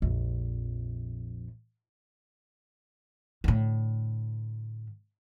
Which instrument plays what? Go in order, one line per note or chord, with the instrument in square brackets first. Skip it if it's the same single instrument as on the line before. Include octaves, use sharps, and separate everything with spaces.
[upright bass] A#1 F2
A2 D3